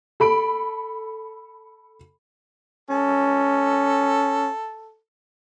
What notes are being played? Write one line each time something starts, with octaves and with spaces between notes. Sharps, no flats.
A4 B5 D7
C#4 A4